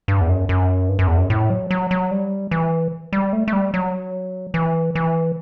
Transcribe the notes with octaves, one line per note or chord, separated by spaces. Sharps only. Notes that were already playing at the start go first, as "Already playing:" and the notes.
G2
E2
F#2
F#2
G2
F#2
E2
F#2
A2
F#3
F#3
F#3
G3
E3
G3
A3
A3
G3
F#3
E3
E3